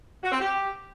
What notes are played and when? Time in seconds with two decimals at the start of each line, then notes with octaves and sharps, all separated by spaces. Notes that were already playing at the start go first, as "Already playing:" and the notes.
0.24 F#4
0.32 C4
0.40 G4